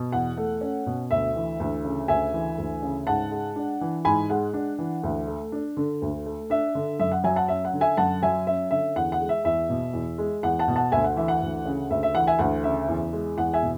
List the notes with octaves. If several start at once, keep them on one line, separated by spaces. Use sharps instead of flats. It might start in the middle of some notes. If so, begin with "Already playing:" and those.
Already playing: B2
E2 F#5
A3
C#4
B2
D2 E5
E3
D2
C#3
D2 E5 G#5
E3
D2
C#3
G#2 F#5 A5
G#3
D4
E3
G#2 G#5 B5
G#3 F#5
D4
E3
D2
A3
D4
D3
D2
A3
D4 E5
D3
F#2 E5
F#5
F#3 E5 G#5
F#5 A5
C#4 E5
F#5
D3
E5 G#5
F#2 F#5 A5
F#3 E5 G#5
C#4 E5
D3 E5
E2 F#5
F#5
G#3
E5
E2 E5
B2
E2
G#3
E2 F#5
F#5 A5
B2
F#5 A5
D2 E5 G#5
F#5
E3 E5
F#5
D2
C#3
D2 E5
E5
E3 F#5
E5 G#5
D2 F#5
C#3 E5
E2
G#3
E2 F#5
E5 G#5
B2